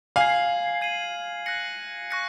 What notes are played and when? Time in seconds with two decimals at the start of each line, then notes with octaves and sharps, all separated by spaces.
0.16 F5 G#5 G#6 C7 F#7
0.81 G#6 D#7 F#7
1.46 F#6 A#6 C#7 F#7
2.11 C#6 F#6 A#6 C#7